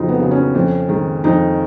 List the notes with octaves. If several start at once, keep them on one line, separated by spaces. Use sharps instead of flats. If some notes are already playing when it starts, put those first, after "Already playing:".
Already playing: F2 C#3 F#3 D#4 F4
B3
C#3 F#3
C#4
F2
D#3 G#3
F2 D#4